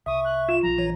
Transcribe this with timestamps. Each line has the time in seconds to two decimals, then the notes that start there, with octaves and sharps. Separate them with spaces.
0.06 C2 E5 C#6 D#6
0.25 F#6
0.49 F4 E7
0.63 A#1 F3 A#5
0.78 E3 C#5